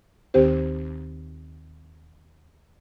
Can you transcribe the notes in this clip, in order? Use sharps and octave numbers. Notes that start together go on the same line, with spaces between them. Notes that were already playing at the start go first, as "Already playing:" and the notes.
D#2 D#3 C4 G4 C5